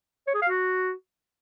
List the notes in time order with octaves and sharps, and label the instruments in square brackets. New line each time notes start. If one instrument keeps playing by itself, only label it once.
[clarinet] C#5
G#4
F5
F#4